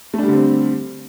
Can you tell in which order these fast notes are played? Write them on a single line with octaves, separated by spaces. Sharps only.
A3 D4 G3 D3 C4